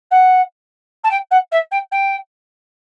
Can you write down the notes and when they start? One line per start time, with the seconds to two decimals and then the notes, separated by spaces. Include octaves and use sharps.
0.11 F#5
1.04 A5
1.11 G5
1.31 F#5
1.52 E5
1.71 G5
1.91 G5